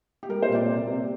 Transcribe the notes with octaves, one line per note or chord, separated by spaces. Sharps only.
G4
G3 A#4
C5
A#2
D5
C3
C3